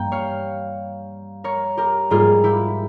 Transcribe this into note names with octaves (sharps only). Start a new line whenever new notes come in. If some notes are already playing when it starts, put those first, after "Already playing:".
Already playing: G2 G3 A#3 G5
C#5 F5
A#4 C#5
G4 A#4
G#2 G3 A#3 F4 G#4
E4 G4